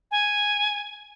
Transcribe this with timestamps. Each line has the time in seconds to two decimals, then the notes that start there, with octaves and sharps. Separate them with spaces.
0.11 G#5